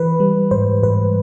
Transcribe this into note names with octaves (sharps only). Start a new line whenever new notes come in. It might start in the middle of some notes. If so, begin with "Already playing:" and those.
Already playing: E3 B4
G3
G#2 C5
G#2 B4